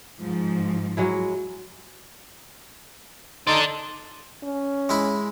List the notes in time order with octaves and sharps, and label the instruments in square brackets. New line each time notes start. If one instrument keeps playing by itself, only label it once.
[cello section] G#2 F3
[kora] F#3 G#3 E4
[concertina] D#4 C6 [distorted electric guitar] A4 D5
[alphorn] C#4
[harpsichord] G#3 E4 B5